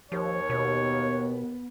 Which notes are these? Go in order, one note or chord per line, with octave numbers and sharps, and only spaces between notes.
D#2 F3 C#5
B2 B3